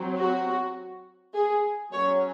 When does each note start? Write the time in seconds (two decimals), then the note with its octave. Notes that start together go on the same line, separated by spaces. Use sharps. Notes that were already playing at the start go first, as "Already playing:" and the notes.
Already playing: F#3 C4
0.18 F#4
1.35 G#4
1.92 F#3 C#4 C#5